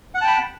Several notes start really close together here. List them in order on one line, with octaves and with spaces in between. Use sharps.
F#5 F#6 A5 G5 B5